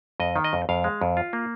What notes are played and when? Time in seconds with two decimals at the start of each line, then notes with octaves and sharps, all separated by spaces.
0.20 F2 D#5
0.36 D#3
0.44 D#5
0.53 F2
0.69 F2 F5
0.84 G#3
1.01 F2
1.17 F4
1.33 A#3